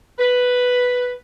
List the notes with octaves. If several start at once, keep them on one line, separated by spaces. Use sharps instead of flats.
B4